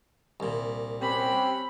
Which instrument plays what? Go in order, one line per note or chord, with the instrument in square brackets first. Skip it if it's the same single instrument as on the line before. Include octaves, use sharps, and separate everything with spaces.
[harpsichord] C2 A#2
[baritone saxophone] C4 [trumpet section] C#4 F#4 G4 [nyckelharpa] B5